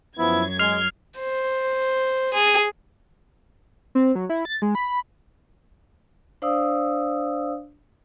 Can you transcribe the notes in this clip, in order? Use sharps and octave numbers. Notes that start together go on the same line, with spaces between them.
F#2 F3 B3 E4 G#6
G#3 F6 C7 F7
C5
G#4
C4
F#3
E4
A6
G#3
B5
D4 C5 D5 F5 D#6 E6